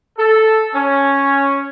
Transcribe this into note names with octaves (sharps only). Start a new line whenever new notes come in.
A4
C#4